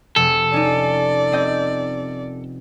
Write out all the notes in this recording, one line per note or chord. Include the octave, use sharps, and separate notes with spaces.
F1 A4
C#4 D#4 D5
C4 D#5 G6